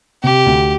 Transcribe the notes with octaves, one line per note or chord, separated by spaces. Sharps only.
C3 G4
D2